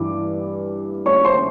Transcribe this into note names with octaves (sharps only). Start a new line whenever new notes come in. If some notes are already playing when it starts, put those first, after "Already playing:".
Already playing: G2 E3 D6
C#5 C#6
C5 C6